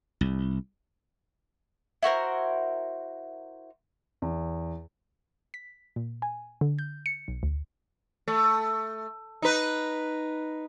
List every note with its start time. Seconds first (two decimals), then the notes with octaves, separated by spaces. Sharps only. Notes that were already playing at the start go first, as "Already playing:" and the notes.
0.21 C2
2.03 E4 F#4 A#4 C5
4.22 E2
5.54 B6
5.96 A#2
6.22 G#5
6.61 D3
6.79 G6
7.06 C#7
7.28 B1
7.43 D2
8.28 A3
9.42 D#4 B4